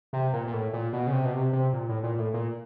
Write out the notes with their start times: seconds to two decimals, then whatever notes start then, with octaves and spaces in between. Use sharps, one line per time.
0.13 C3
0.33 A#2
0.47 A#2
0.54 A2
0.73 A#2
0.93 B2
1.07 C#3
1.13 C3
1.25 B2
1.33 C3
1.53 C3
1.73 A#2
1.89 A2
2.03 A#2
2.19 A2
2.34 A#2